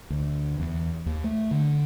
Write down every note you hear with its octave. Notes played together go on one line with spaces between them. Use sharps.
D2
E2
D#2
A3
D3